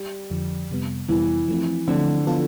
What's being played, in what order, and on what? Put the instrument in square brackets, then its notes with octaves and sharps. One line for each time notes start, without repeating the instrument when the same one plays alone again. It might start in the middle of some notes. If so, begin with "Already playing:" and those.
Already playing: [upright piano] G3
[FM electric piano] F2 D3 F3
F2 C3 G3 B3
[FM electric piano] F2 C3 G3 B3 [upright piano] E3
[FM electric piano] F3 A3 C4
[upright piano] D3 [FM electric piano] F3 A3 C4
[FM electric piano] F3 B3 F4 A4